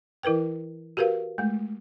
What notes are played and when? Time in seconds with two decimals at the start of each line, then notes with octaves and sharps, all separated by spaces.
0.23 E3 E4 A#4 B4 G5
0.97 F#4 G4 A#4 B4 F5
1.38 G#3 A3